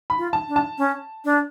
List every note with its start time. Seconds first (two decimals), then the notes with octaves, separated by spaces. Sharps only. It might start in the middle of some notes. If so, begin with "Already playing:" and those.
0.10 B5
0.18 F4
0.33 A5
0.48 D4
0.56 A5
0.78 C#4
1.25 D4